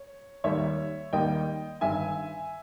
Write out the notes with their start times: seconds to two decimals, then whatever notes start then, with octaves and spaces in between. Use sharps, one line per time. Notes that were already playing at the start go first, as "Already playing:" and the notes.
Already playing: C#5
0.44 D#2 D#3 G3 A#3 C#5 E5
1.13 D#2 D#3 G3 A#3 D#5 G5
1.81 G1 G2 D#3 E5 G#5